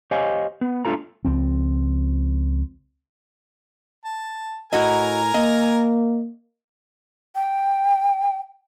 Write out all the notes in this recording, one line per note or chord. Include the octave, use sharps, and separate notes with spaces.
G4 C5 C#5 D#5 F5 G#5
B3
A3 D4 F4 A4 A#5
C#2 F3 C4
A5
A2 E4 F#4 A#4 D#5 G#5 A#5
A#3 D#5
G5